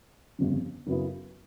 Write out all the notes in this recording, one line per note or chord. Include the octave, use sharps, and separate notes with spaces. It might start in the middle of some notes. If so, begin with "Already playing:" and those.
G1 F2 C#3
F#2 C#3 F#3 B3 E4